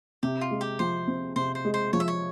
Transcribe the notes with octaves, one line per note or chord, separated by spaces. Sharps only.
C3 G4
F4
G#3
G4
F3 C5
C4
C3 C5
C5
G#3
C5
F3 C#5
E5
C#5